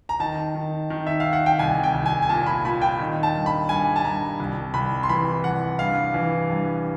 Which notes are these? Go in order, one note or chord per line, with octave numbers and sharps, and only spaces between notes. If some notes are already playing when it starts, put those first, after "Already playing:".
A#5
D#3 A5
D#3
D#3
E5
D#3 F5
F#5
G5
C2 G#5
G5
C2
G#5
G#5
A#2 A5
B5
A#2 B5
G5
D#3
A5
G2
B5
G2 G#5
A5
G2 A#5
C2
C2 B5
C6
E3 B5
C2 F#5
G2 F5
E3
G2